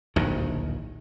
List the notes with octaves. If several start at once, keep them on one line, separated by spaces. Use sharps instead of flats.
D1 A#1 D#2 D#3